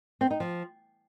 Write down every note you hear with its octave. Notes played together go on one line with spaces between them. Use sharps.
C4
D#4
F3